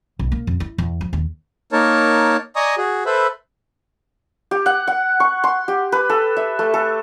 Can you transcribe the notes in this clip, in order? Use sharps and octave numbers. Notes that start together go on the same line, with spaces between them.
B1
A#3
F2
E4
E2
F3
D#2
A#3 D#4 A#4 C#5 A5
D5 D#5 G#5 A#5 C#6 D#6
F#4 G#4
A4 B4 C5 E5 B5
G4
F#5
F#5
C#6
C6
G4
B4
A4
E5
A3
A4